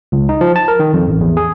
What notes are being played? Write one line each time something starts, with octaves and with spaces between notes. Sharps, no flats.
C#2
D#4
F3
A5
A#4
D#3
F2
A1
E2
G#4